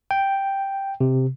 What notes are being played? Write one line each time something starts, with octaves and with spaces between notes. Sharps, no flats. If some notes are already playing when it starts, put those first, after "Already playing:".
G5
C3